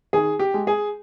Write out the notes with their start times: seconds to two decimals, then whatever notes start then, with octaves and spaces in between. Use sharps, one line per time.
0.13 D#3 G#4
0.39 G4
0.54 G#3
0.67 G#4